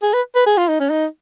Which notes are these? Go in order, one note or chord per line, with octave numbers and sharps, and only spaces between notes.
G#4
B4
B4
G#4
F4
D#4
C#4
D#4